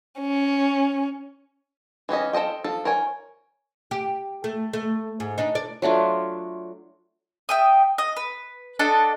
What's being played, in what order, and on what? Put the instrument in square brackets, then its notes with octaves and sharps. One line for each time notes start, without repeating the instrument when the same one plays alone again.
[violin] C#4
[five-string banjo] E3 C4 C#4 D#5
A4 C5 D#5 G5
F3 A4
A#4 C5 C#5 G#5
[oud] G4
A3
A3
G#2
D4 D#4
D5
[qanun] F#3 A3 D4 F4
[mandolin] E5 G5 D#6
D#5
B4
D4 A4 D#5 F#5